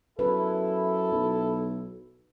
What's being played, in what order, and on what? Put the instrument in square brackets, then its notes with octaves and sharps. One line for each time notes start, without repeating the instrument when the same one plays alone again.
[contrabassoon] F#2 [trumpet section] E4 [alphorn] A4 [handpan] B4
[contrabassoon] B1